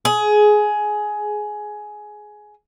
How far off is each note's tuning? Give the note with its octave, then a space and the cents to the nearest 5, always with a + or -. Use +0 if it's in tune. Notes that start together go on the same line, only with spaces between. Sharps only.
G#4 +15